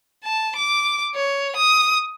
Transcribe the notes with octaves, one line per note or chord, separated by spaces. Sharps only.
A5
D6
C#5
D#6